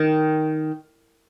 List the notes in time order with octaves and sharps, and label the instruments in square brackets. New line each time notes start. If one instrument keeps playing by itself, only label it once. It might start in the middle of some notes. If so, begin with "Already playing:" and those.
Already playing: [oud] D#3